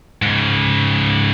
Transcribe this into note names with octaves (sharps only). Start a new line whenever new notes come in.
G#2 C#3